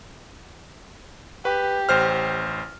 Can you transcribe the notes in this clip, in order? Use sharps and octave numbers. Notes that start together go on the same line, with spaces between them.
G4 B4
A1 C5 F6